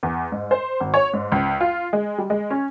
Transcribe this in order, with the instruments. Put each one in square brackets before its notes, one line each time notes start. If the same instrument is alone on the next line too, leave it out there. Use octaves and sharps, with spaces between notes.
[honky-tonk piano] E2
G#2
C5
G#1
C#5
G#2
C#2
F4
G#3
G3
G#3
C#4